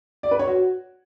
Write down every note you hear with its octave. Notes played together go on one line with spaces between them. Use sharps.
D5
B4
C#5
F#4